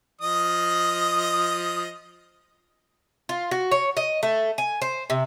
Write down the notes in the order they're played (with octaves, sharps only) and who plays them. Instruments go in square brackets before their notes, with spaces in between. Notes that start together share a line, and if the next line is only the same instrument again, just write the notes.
[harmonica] F3 D#5 D#6
[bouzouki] F4
F#4
C#5
D#5
A3
G#5
C5
C3